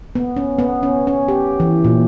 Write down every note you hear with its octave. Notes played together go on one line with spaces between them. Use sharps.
B3
C#4
B3
C#4
C#4
G4
E3
A#2